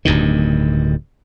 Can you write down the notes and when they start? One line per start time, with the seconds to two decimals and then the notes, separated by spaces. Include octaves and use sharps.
0.05 D1 D2 G2 D#3